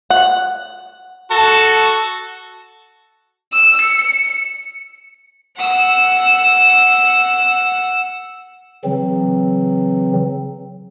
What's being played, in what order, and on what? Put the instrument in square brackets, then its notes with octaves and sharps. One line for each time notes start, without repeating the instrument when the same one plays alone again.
[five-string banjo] F#5
[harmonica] F#4 A4
[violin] E6
C#7
[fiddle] F#5 E6
[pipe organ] C#3 E3 F#3 C4